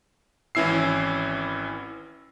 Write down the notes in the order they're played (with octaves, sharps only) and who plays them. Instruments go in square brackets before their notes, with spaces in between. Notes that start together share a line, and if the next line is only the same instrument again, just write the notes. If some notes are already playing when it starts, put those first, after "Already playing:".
[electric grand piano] G#1 E3 C#4 E4 E6 C7